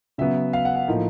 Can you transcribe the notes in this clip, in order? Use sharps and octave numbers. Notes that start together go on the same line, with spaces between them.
C#3 F#3 B3 E5
F5
F#5
F#5
A2 F3 A#3 D#4